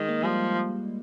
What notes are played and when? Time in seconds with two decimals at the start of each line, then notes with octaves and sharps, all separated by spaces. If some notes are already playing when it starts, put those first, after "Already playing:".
Already playing: D#3 G#3
0.09 A#3
0.24 F3 G3